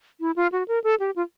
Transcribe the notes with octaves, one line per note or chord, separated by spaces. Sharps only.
E4
F4
F#4
A#4
A4
G4
F4